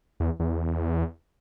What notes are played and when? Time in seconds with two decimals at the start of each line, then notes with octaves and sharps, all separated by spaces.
0.20 E2
0.40 E2